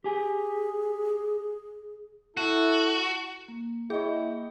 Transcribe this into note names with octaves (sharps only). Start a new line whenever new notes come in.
G4 G#4 G#5
E4 F#4 A4
A#3
E4 G#4 C#5 D#5 G5